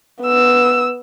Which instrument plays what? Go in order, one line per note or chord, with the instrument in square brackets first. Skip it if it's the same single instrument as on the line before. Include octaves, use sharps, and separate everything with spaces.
[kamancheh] B3 E6